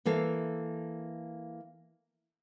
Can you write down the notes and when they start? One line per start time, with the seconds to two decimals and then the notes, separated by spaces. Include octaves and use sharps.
0.05 E3 A#3 A4 F5